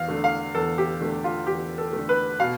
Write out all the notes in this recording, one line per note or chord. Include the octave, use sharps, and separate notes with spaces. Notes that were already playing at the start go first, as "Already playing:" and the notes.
Already playing: E2 F5
D3 A3
F5
E2 A4
G4
D3 A3
F4
E2 G4
A4
D3 A3
B4
B2 F5